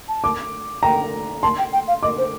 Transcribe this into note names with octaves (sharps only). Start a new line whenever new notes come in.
A5
D6
G5 A#5
A5 C6
G5
G5
F5
D#5 D6
C5